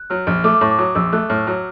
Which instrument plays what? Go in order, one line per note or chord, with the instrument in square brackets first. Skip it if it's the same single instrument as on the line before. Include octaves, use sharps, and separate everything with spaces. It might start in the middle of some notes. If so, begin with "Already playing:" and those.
Already playing: [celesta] F#6
[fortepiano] F#3 [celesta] F6
[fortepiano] A#1 [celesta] F6
[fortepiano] A3 [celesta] D6
[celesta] D6
[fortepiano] A2 [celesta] C#6
[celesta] D6
[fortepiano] F#3 [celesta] D#6
[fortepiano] A#1 [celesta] E6
[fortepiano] A3 [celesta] F#6
[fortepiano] A2 [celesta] F6
[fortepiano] F#3